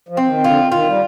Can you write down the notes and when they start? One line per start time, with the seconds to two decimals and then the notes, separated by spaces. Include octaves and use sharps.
0.09 F3
0.17 C4
0.22 F3
0.27 D#3
0.44 D3 F4
0.72 D#3 F4
0.86 G3